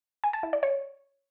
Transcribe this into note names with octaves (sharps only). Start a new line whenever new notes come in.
G#5
A5
E4
D5
C#5